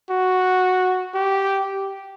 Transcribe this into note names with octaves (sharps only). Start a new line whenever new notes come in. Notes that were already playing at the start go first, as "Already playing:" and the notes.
F#4
G4